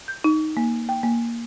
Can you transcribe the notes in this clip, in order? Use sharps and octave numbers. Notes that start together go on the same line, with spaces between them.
G6
D#4
A#3
G5
A#3